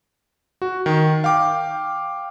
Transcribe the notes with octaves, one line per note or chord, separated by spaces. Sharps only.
F#4
D#3
F5 G5 D6